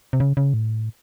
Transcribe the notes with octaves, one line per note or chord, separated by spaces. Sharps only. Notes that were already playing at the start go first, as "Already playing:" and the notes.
C3
C#3
C#3
A2